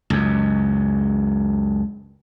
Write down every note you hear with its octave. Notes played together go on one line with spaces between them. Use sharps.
C#2 F#2